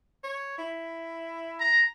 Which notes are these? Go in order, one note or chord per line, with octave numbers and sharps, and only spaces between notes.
C#5
E4
A#5